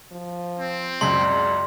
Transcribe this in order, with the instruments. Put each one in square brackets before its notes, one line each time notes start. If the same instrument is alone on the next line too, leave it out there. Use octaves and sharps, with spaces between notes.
[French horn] F3
[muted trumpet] C4
[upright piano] C#2 F#2 C#3 [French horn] D5 [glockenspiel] C6